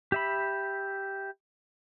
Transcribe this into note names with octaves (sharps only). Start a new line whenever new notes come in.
G4 E5 B5